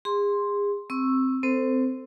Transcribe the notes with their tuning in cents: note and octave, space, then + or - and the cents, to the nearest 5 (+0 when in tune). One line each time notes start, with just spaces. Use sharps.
G#4 -35 C6 +0
C4 +0 C#6 -15 E6 +0
C4 -20 A4 +20 C5 +0